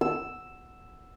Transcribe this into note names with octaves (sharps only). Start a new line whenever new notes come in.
E6